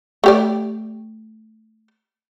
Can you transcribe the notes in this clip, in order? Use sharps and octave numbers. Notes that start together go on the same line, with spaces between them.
A3 G4 D5